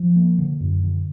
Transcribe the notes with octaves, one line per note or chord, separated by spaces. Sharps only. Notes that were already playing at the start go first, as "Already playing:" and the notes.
Already playing: F3
A#3
D3
F#2
D3